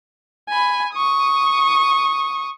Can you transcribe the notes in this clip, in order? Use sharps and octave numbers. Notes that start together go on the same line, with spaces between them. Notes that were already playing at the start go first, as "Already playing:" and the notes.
G#5 B5
C#6 D#6